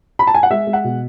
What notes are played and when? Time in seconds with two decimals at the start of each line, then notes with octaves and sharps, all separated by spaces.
0.19 B5
0.27 A5
0.34 G#5
0.43 F#5
0.51 G#3 E5
0.67 G#3
0.73 F#5
0.84 B2